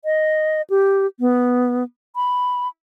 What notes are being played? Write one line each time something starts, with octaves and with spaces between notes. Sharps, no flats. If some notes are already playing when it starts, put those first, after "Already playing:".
D#5
G4
B3
B5